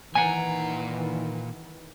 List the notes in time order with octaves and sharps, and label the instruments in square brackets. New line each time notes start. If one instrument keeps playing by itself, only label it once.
[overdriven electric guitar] A#2 A#5 [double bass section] D#3 E3 [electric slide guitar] F#5 G#5